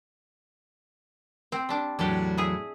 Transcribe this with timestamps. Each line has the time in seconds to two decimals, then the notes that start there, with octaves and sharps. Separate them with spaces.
1.52 C4
1.69 G3 D4
1.99 E2 A2 F#3 D4 G4
2.38 E4 G#4